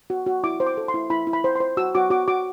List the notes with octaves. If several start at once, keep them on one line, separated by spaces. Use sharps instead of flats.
F#4
F#4
E4 D6
C5
D6
A4
C6
E4
E4 B5
E4
B5
C5
C5 C6
F#4 E6
F#4 D6
F#4 D6
F#4 D6